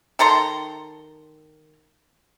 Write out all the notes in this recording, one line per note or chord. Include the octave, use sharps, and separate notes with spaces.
D#3 A4 A#5 C6